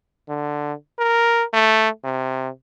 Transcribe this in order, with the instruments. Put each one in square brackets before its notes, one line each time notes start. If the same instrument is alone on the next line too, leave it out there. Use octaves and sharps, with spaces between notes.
[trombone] D3
A#4
A3
C3